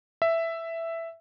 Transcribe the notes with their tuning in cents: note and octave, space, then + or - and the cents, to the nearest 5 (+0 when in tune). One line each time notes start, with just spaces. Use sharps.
E5 +5